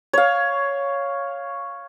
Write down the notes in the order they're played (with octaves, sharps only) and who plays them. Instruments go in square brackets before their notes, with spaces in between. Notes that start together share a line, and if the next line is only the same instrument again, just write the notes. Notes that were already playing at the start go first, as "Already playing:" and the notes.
[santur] C#5 F5